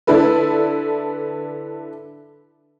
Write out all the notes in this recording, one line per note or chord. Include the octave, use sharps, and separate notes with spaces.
D3 D4 E4 A4 B4